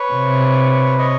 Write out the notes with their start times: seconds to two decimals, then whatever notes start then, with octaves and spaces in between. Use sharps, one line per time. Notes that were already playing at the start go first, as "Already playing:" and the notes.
Already playing: B4 C#5
0.13 C3
0.98 C#5 D#5